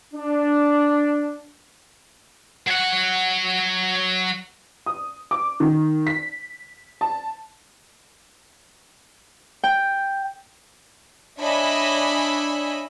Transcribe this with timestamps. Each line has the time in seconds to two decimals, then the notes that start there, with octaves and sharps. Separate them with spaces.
0.13 D4
2.67 F#3 F#5
4.86 D#6
5.31 D6
5.60 D#3
6.07 B6
7.01 A5
9.64 G5
11.40 D4 C#5 D#5 E5 G#5 B5